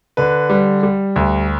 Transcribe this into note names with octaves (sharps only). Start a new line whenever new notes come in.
D3 B4
G3
G3
D2